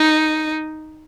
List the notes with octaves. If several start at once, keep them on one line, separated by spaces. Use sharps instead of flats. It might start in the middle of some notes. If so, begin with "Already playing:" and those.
Already playing: D#4